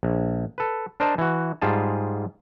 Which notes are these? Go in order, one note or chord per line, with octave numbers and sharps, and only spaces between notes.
A#1
A4 B4
D4 A#4 C5 D5 D#5 A5
E3 F#4
G#2 G3 F4 G#4 A5